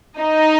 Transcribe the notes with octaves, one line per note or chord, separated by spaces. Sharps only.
D#4 D#5